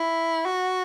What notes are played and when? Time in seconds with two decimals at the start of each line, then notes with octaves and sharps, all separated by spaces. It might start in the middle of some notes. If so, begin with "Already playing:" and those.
Already playing: E4
0.46 F#4